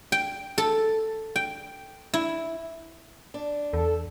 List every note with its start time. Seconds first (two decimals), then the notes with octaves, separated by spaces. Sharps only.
0.12 G5
0.58 A4
1.36 G5
2.14 E4
3.34 D4
3.73 E2 A4